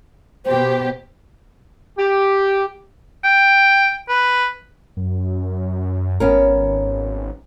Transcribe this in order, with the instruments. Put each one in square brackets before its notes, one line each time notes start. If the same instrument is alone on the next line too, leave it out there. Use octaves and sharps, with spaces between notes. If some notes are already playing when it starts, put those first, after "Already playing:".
[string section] B2 G4 [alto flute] C5
[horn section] G4
[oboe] G5
B4
[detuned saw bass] F#2
[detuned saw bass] G#1 [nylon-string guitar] B3 C#4 A#4